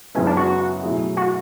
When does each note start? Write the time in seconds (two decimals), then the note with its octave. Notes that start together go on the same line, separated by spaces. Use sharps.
0.15 F#2 C#3 G#3 B3 C#4 E4
0.26 D4
0.37 F#4
0.83 B2 F#3 A3 E4 G#4
1.17 F#4